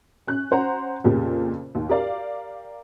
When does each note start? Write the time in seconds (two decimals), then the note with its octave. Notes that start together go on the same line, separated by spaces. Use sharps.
0.27 C#4 F#6
0.51 C#4 C5 F#5 A#5
1.04 F2 A#2 C#3 G4
1.75 D#2
1.89 G4 A#4 D5 F5